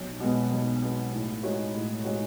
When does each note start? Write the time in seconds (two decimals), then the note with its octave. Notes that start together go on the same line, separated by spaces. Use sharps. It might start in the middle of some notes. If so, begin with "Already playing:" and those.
Already playing: B1
0.20 B2 G#3 B3
0.51 B1
0.82 B2 G#3 B3
1.12 A2
1.43 G#3 D#4 F#4 C#5
1.74 A2
2.05 G#3 D#4 F#4 C#5